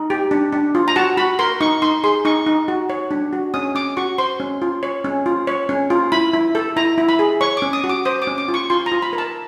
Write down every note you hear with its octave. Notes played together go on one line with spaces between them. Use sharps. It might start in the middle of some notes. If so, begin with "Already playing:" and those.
Already playing: D#4
G4
D4
D4
F4
A#5
F#4 A5
F#4 B5
A#4 C6
D#4 C#6
D#4 C6
G#4 C6
D#4 C#6
D#4
F#4
C#5
D4
F#4
C#4 D#6
C#4 D6
F#4 C#6
C5 C6
C#4
F4
C#5
C#4
F4
C#5
C#4
F4
E4 B5
E4
A4
E4 A#5
E4
B5
G#4
C#5 C#6
C#4 D6
D#6
F#4
D6
C5 D#6
D6
C#4
D6
F4
C#6
F4 C6
A#5
F4
B5
A#4
A5